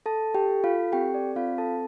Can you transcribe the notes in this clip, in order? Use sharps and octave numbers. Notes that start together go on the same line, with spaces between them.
A4 A5
G4 G5
A4
F4 F5
C4 G4 G5
D5
C4 F4 F5
A4 A5